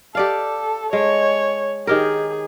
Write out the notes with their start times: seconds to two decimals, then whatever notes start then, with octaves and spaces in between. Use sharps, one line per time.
0.15 G4 A4 D5 F5
0.93 G#3 C#5
1.87 D#3 G4 G#4 A#4